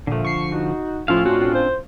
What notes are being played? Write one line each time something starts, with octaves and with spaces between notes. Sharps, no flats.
A#2 D3 F3 A3
C#6 C7
D#4 F#4
A2 F3 C#4 E4 F4 F5
C4 D4 F#4
C5